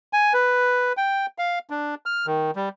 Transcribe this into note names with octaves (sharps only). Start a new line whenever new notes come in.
G#5
B4
G5
F5
D4
F6
D#3
G3